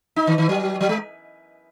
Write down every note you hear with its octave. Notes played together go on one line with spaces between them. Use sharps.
D#4
D#3
D#3
F#3
F#3
G#3